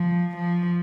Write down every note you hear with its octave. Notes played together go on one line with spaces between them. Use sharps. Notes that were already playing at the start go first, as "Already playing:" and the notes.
Already playing: F3
F3